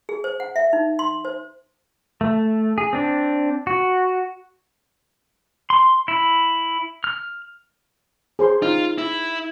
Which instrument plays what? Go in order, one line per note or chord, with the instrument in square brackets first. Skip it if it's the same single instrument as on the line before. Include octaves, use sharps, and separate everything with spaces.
[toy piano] G#4
C5
F#5
E5
D#4
C6
C5
[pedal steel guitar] A3
G#4
C4 D4
F#4
C6
E4
F6
[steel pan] G#4 C5 C6
[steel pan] D#4 [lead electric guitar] F4
[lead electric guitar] E4